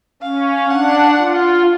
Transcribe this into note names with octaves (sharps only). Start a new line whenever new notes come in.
C#4 F5
D4 F#5
F4